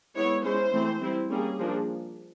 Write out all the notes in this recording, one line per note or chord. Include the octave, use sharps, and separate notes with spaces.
G#3 B3 E4 C#5
G#3 C#4 E4 C5
E3 A3 C4 E4
G3 C4 E4
G3 A#3 C#4 G#4
F3 A#3 D4